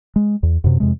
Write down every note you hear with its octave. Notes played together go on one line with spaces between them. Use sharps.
G#3
E2
F#2 C3
F2 C3 G#3